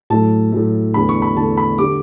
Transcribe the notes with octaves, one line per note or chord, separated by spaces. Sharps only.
A2 F#3 A3 A5
A2 F#3 A3
E2 D3 A3 B5
C#6
B5
E2 D3 A3 A5
B5
D3 G3 D6